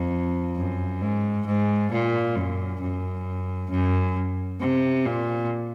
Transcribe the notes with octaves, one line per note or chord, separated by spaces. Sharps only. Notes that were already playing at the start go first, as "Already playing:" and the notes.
Already playing: F2
F#2
G#2
G#2
A#2
F#2
F#2
F#2
C3
A#2